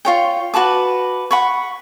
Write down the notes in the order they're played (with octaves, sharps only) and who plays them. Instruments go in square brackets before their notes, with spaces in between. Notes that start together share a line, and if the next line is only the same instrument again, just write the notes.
[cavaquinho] F4 C#5 G5
F#4 B4 A5 D6
F#5 B5 C#6